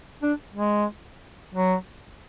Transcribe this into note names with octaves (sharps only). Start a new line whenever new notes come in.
D4
G#3
F#3